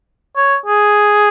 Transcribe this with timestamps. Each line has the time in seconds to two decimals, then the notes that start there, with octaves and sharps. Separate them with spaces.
0.36 C#5
0.66 G#4